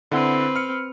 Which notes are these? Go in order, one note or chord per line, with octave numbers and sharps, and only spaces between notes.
D3 C4 E4 B4 F#5
F6 C#7